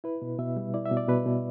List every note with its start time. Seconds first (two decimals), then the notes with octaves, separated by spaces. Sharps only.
0.04 E4 B4
0.22 B2
0.39 B2 E5
0.57 G3
0.74 E4 D5
0.85 E5
0.92 B2
0.97 D5
1.08 B2 B4
1.26 B2